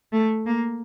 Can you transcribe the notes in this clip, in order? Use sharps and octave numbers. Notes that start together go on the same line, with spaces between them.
A3
A#3